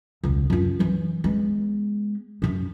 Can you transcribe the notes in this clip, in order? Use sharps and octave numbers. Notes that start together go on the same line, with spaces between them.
E1 C#2
F#2 F4
E3 F#3
G#3 B3
F#2 D#4